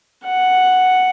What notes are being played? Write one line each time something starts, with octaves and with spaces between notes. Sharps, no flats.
F#5